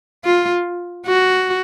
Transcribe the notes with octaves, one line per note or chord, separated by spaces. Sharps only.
F4
F#4